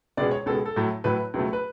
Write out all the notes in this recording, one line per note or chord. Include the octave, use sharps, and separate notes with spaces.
C#2 B2 G#3 D5
C#5
C#2 B2 G#3 A4
A4
A2 F#3 A3
A2 F#3 A3 B4
C#2 B2 F#3 A3
B4